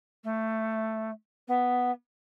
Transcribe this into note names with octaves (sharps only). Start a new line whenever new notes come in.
A3
B3